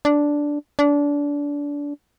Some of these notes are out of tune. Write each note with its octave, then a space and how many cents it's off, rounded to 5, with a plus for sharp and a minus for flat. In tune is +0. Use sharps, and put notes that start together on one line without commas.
D4 -5
D4 -25